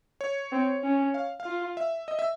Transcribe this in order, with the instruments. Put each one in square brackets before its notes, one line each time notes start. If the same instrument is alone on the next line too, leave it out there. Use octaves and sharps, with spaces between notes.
[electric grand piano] C#5
[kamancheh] C4
C#4
[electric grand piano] F5
F5
[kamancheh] F4
[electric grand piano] E5
D#5
E5